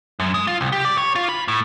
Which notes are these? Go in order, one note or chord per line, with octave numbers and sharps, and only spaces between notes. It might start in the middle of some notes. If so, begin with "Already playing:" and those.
F#2
G#3
F4
C2
G4
D5
C#5
F4
B5
A2